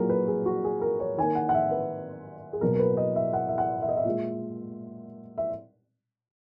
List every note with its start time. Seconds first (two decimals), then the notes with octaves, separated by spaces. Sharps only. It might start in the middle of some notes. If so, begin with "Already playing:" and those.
Already playing: A#2 F#3 A#3 G#4 A#4
0.09 B4
0.28 G#4
0.46 F#4
0.64 G#4
0.81 A#4
1.00 C#5
1.18 D#3 A#3 G#5
1.35 F#5
1.49 F#5
1.54 E5
1.71 B4
2.53 G#4
2.61 B2 F#3 A#3 A#4
2.74 A#4
2.79 B4
2.97 D#5
3.16 E5
3.33 F#5
3.49 E5
3.58 F#5
3.82 E5
3.89 D#5
3.97 E5
4.05 A#2 G#3
5.38 E5